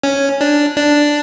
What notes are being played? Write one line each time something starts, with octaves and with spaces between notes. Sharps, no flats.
C#4
D4
D4